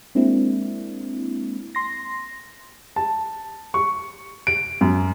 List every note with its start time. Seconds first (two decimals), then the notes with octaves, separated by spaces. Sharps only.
0.15 G#3 A#3 C4 D4 E4
1.75 C6 A#6
2.96 A5
3.74 C#6
4.47 D7
4.81 F#2